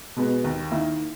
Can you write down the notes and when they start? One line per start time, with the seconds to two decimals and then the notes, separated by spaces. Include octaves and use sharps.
0.16 B2 G#3 B3
0.44 D#2
0.71 D#3 A#3 E4